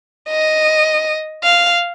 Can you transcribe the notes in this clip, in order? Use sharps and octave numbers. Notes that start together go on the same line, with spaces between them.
D#5
F5